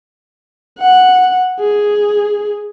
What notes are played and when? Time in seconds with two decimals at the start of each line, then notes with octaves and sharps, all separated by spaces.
0.79 F#5
1.60 G#4